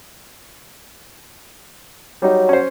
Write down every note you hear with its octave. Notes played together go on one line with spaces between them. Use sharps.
F#3 G3 D#4
C#4 C5